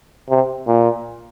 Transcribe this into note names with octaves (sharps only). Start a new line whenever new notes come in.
C3
A#2